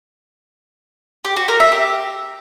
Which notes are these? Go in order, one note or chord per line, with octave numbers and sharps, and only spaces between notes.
G4
F#4
A#4
E5
G4